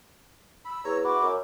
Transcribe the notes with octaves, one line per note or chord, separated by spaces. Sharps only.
B5 E6
E2 C#5 A#5
E4 F#4 D6
F#2